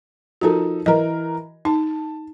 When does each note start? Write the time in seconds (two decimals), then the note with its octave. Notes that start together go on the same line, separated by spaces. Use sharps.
0.41 F3 D#4 F#4 A4 A#4
0.86 E3 A#4 D#5
1.65 D#4 A5